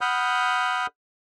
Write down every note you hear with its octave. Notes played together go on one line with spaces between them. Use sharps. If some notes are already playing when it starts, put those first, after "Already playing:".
F#5 B5 D#6 F6 G6